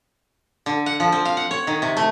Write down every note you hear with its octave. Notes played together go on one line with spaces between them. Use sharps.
D3
F#5
F3
C4
F5
F#5
C#5
D#3
C3
A3